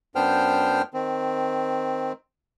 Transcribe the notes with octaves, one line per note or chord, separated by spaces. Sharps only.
F#2 B3 D4 C5 G5 F6
D#3 C4